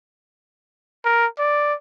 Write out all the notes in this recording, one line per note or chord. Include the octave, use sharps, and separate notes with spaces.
A#4
D5